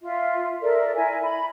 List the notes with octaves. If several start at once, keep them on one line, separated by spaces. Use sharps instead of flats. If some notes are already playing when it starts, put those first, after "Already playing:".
F4 E5
A4 A#4 D5 E5
E4 A#4 E5 G#5
B5